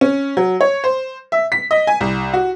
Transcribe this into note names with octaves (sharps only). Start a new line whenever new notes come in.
C#4
F#3
C#5
C5
E5
B6
D#5
G#5
C2
F#4